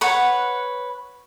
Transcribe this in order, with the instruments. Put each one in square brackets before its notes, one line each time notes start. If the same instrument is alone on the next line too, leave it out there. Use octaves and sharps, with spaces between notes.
[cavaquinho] B4 C#5 F#5